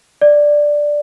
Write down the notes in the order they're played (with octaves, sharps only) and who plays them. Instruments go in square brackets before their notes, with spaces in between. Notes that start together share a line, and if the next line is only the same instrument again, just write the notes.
[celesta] D5